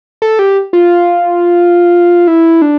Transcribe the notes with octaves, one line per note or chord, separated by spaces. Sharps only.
A4
G4
F4
E4
D4